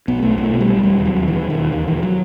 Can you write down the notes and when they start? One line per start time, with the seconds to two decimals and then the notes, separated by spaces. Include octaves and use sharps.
0.08 B1 B3
0.22 B1 A3
0.38 B2 A3
0.53 B2
0.61 G3
0.67 B1
0.83 E1 G3
0.98 D#2
1.05 F#3
1.13 D#2
1.28 E1 E3
1.43 E1
1.50 D#3
1.58 D#2
1.72 D#2 D#3
1.88 E1 E3
2.03 F#3